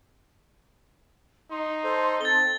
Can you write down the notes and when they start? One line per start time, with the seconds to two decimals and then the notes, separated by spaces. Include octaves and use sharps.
1.51 D#4 C6
1.84 A4 C5
2.21 C4 A4 A5 A6 G7